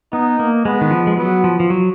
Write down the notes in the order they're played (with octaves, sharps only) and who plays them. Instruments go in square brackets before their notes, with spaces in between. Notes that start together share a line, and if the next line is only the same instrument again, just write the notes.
[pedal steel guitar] B3 [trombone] D#4
[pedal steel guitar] A#3
[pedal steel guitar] G#3 [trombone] B3
[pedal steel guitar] D#3
F3
G#3
[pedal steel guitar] F#3 [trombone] B3
[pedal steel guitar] F3
F3
F#3